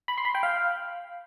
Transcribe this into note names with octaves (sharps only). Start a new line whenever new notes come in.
B5
C6
B5
G5
F5